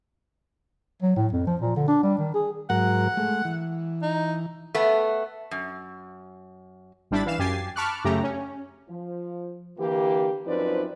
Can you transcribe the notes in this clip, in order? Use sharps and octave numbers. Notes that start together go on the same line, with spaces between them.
F#3
A2
F2
F3
A#2
D3
D4
G3
D#3
G#4
G#2 F#3 A#4 F#5
G#3 A3
E3
D#4
A3 B3
F#2
G#1 G3 D4 E4 B5 A6
E3 F5 E7
F#2 G4 G#5 A6 C7
A5 B5 C#6 D6 F6 F#6
F#2 C#3 A3 G4 A#5
C#4
F3
D3 E3 A#3 G4
F#2 F3 C4 D#4 B4 D5